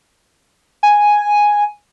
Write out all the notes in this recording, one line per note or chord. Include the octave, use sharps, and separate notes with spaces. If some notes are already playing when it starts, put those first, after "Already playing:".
G#5